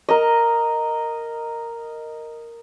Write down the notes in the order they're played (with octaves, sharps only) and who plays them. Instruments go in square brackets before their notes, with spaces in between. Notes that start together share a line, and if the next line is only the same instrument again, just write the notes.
[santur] A#4 D#5